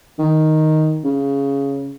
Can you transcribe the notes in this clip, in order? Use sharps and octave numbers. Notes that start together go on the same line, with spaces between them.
D#3
C#3